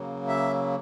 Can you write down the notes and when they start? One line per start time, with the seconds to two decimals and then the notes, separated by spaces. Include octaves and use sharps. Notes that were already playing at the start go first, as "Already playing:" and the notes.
Already playing: C#3 F#3 A#3
0.28 E5